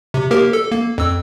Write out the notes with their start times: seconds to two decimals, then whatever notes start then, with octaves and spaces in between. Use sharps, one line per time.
0.14 C3
0.31 A#3 G4 A#4
0.53 A4
0.72 A#3
0.98 F2 E6